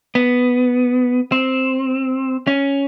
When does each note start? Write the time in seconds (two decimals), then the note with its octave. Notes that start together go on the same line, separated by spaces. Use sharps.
0.15 B3
1.32 C4
2.47 C#4